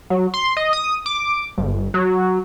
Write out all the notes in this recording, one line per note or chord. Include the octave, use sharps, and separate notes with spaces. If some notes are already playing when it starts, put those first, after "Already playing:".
F#3
C6
D#5
D#6
D6
G1
F#3